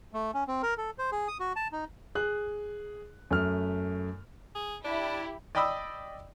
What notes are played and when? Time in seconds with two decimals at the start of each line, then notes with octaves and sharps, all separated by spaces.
0.13 A3
0.34 C#4
0.47 C4
0.62 A#4
0.78 A4
0.98 C5
1.12 G#4
1.28 D#6
1.40 F#4
1.56 A5
1.72 D#4
2.15 G#4 F#6
3.31 F#2 A3 F6
4.55 G#4
4.84 D4 E4 G4
5.55 D5 D#5 G5 B5 D#6 E6